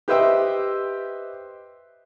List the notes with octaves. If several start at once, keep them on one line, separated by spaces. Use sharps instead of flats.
G4 B4 C5 D#5 E5 G5